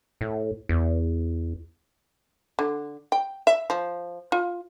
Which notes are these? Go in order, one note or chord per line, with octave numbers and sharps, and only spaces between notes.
A2
E2
D3
G5
E5
F3
F4